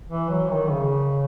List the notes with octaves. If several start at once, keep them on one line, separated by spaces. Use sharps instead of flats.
E3
F#3
D#3
C#3